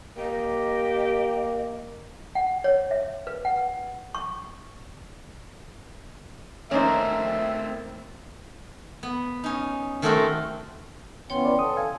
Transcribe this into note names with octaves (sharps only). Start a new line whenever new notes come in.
A#3 G4 D#5
F#5
C#5
E5
B4
F#5
C#6
D#3 A3 A#3 C4 C#4 D#4 C5 E5
B3
C#4 D#4
D#3 A3 C4 F#4 A4 A#4
E3 B3 C#4 C#5 G5 C6
B4 D5
A4 D#6
F5 G#5